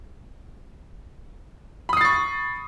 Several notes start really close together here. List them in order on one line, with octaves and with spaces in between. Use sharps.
B5 D#6 C7 A6 C#6